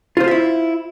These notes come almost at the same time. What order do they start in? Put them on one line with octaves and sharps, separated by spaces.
F4 C5 F5 E5 E4